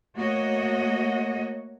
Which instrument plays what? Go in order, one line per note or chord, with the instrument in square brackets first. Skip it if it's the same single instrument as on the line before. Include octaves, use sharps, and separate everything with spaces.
[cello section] A3 A#3 F#4 C#5 D#5